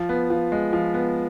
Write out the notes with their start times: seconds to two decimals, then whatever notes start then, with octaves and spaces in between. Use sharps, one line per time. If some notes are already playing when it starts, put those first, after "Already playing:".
Already playing: F3
0.09 B3
0.30 F3
0.52 G#3
0.73 F3
0.94 B3